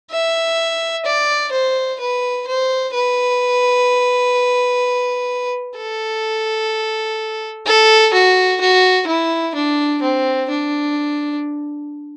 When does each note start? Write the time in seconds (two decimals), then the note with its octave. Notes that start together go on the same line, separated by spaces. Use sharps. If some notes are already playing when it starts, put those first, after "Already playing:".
0.11 E5
1.05 D5
1.52 C5
2.00 B4
2.47 C5
2.94 B4
5.77 A4
7.66 A4
8.13 F#4
8.61 F#4
9.07 E4
9.55 D4
10.02 C4
10.50 D4